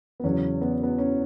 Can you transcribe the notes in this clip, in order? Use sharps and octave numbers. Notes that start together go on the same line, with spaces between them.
B3
E2 C#3 F#3 C#4
B3
B3
C#4